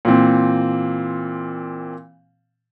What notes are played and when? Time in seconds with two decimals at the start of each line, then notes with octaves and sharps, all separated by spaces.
0.05 A#2 E3 C4